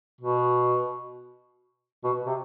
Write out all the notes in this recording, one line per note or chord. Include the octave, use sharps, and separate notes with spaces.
B2
B2
C3